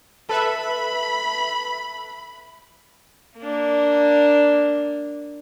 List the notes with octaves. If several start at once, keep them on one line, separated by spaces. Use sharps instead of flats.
A4 B4 E5 A5 B5
A#3 D4